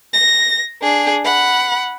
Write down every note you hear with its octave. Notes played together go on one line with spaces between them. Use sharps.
A#6
D4 G#4
F#5 B5